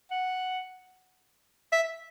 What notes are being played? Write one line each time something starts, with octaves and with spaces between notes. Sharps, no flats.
F#5
E5